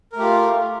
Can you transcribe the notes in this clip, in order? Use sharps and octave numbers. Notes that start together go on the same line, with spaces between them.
A3 F4 G4 A#4